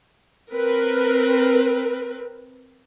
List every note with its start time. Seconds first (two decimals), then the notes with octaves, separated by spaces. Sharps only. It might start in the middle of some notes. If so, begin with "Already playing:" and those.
0.52 C4 A#4 B4